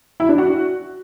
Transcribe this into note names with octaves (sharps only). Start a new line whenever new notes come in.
E4
D4
F#4